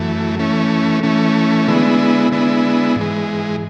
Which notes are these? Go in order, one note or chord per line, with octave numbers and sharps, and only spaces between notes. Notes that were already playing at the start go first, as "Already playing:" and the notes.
Already playing: F#2 E3 A3
E3 A3 C#4
E3 A3 C#4
D3 G#3 B3 E4
D3 G#3 B3 E4
G#2 E3 G#3